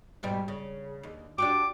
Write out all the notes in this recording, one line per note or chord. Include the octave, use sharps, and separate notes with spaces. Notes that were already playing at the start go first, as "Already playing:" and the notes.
G#2 B2 G3
C#3
D#2
D4 F#4 G4 D6